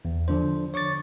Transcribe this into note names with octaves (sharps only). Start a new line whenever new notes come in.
E2
D3 F3 D4 C5
C#5 C#6 D6 A6